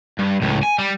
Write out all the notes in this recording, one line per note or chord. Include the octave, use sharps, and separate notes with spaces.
G2
C#2 A2
G#5
G3